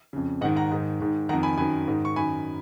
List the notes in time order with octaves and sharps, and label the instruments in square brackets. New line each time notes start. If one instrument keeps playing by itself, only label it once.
[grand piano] F2 C#3
G#2 D#5 F#5
D#3
F#5 A#5
G#2 D#3
G#2 D#3
D#3 F#5 A#5
F2
G#5 B5
F#2 D#3 G#5 B5
G#2 D#3
C#6
F#2 D#3 G#5 B5